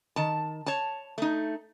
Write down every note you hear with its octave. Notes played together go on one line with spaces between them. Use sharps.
D#3 A5
C#5 A5
A3 D#4